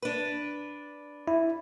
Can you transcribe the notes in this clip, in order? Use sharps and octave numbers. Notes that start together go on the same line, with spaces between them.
D4 B4
E4